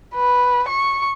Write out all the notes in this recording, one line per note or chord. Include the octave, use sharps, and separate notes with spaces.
B4
C#6